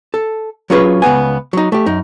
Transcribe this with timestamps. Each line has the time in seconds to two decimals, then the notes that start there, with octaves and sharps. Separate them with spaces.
0.14 A4
0.70 F#3 C#4 F4 G#4 B4 C#5
1.02 C#2 F#2 B3 G#5
1.53 F#3 D#4
1.72 A3 G4
1.86 F#2 D#4